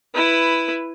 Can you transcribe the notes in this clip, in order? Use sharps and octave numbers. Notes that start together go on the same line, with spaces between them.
E4 B4